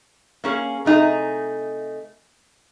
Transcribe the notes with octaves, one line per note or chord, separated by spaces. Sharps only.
A#3 C#4 G#4
C3 A3 D#4 G#4